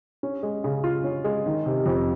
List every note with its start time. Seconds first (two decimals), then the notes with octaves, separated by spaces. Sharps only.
0.23 C#4
0.43 G#3
0.64 C#3
0.84 F4
1.04 C#4
1.25 G#3
1.46 D#3
1.66 C3
1.86 F2